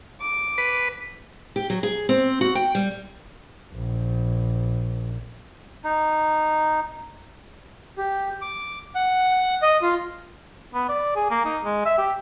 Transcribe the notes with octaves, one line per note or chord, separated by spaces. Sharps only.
D6
B4
G4
F#3
G#4
C4
F#4
G5
G3
A#1
D#4
G4
D6
F#5
D#5
F4
B3
D5
G#4
A#3
D#4
G#3
E5
G4